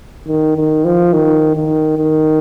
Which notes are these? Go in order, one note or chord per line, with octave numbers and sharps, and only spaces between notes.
D#3
D#3
F3
D#3
D#3
D#3